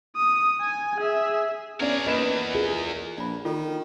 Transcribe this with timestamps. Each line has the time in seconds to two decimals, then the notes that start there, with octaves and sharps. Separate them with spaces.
0.16 D#6
0.61 G#5
0.97 G#4 E5
1.80 B3 C#4 G#4 A#4 D5
2.07 E2 A#3 B4 D#5 E7
2.53 F4 G#4 A#4
3.18 A#1 D5 B5
3.45 D#3 F4 A4